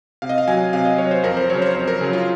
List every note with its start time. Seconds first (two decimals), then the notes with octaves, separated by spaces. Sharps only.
0.22 C3 F5
0.29 D#5
0.38 F5
0.48 F#3 G#5
0.73 C3 F5
0.85 D#5
0.98 F#3 C#5
1.11 C5
1.23 F2 A#4
1.37 C5
1.49 C#3 F#3 C#5
1.62 C5
1.75 F2 C5
1.88 A#4
2.00 C#3 F#3 G#4
2.13 F4